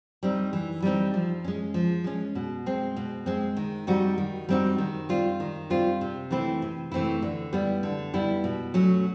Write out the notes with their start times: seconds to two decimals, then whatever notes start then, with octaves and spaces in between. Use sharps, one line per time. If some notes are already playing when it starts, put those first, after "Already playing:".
0.23 G3 C4 D#4
0.53 E3
0.82 G3 C4 D#4
1.14 F3
1.44 G#3 C#4
1.74 F3
2.04 G#3 C#4
2.35 B2
2.66 G#3 C4
2.96 B2
3.26 G#3 C4
3.56 D#3
3.87 G3 C4 D#4 F#4
4.18 D#3
4.49 G3 C4 D#4 F#4
4.78 D#3
5.09 G3 C4 F4
5.40 D#3
5.70 G3 C4 F4
6.01 C3
6.31 E3 A3 C4 E4
6.62 C3
6.92 E3 A3 C4 E4
7.22 D3
7.53 G3 B3 E4
7.83 D3
8.14 G3 B3 E4
8.44 B2
8.74 F#3 A3 C#4